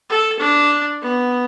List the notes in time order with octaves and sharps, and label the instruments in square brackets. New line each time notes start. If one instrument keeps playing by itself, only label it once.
[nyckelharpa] A4
D4
B3